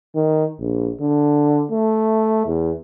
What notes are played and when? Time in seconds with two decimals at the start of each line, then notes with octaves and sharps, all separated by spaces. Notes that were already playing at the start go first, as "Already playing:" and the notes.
0.15 D#3
0.59 A#1
1.00 D3
1.71 A3
2.46 E2